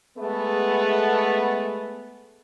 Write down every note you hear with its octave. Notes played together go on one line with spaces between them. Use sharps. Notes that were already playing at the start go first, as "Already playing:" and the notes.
G#3 A3 B3